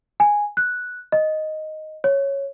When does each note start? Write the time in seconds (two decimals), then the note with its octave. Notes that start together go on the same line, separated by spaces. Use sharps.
0.20 G#5
0.57 F#6
1.12 D#5
2.04 C#5